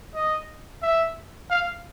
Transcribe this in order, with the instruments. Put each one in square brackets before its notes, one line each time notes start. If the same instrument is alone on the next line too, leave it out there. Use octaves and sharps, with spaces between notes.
[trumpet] D#5
E5
F5